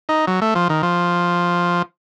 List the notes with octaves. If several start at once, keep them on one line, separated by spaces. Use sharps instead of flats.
D#4
F#3
A3
F3
D#3
F3